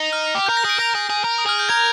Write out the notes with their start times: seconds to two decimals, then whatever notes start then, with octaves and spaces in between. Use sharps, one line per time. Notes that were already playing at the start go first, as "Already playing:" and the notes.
Already playing: D#4
0.13 F6
0.35 G4
0.46 A#4 G6
0.57 A#6
0.65 G#4 D7
0.79 A#4 A#6
0.95 G#4
1.10 G#4
1.25 A#4
1.38 D#6
1.46 G#4 F6
1.59 G6
1.69 A#4 G#6